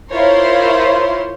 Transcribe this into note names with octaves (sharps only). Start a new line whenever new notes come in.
E4 F4 A#4 C5 C#5 C6